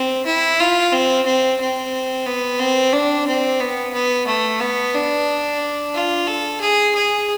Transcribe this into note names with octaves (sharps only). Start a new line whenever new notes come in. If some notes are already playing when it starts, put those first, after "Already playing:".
Already playing: C4
E4
F4
C4
C4
C4
B3
C4
D4
C4
B3
B3
A3
B3
D4
F4
A4
G#4
G#4